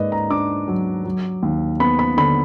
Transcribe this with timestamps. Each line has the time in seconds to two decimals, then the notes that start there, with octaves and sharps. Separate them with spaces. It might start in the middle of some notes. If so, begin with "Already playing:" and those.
Already playing: G#2 A#3 B4 D5 D#5
0.12 A#5
0.30 D4 D6
0.68 F#3
1.05 F#3
1.43 D#2
1.80 B3 B5
1.99 B5
2.17 D3 B5